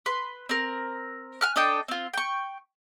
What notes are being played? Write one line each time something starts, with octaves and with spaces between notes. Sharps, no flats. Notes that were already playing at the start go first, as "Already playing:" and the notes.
B4 C6
C4 A#4
G#5 F6 F#6
D4 A4 D#5 G5
C4 F4
G5 C#6